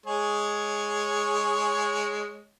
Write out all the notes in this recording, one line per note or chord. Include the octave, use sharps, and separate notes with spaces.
G#3 G#4 C#5